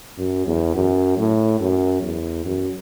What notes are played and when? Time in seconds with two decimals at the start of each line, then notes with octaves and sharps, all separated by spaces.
0.18 F#2
0.47 E2
0.75 F#2
1.18 A2
1.60 F#2
2.02 E2
2.45 F#2